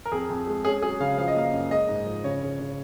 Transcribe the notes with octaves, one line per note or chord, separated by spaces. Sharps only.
A#4
F2 G#4
F2
G#3
C#4 G#4
F#3 G#4
C#3 F5
F3 F5
D#5
A#3 F5
F#2
G#3 D#5
G#2
F3
C#3 C#5
C#3
C#3